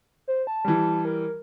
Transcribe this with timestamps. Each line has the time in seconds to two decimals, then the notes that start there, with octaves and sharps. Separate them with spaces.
0.28 C5
0.47 A5
0.65 E3 G3
1.05 A#4